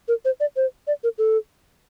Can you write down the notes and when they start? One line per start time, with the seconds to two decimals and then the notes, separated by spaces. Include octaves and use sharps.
0.08 A#4
0.25 C5
0.40 D5
0.56 C5
0.87 D5
1.04 A#4
1.18 A4